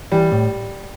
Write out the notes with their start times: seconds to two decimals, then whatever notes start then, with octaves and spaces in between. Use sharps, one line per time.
0.12 E3 G3
0.32 A2